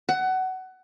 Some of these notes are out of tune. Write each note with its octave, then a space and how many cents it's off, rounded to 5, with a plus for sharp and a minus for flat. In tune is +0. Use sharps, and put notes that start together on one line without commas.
F#5 +20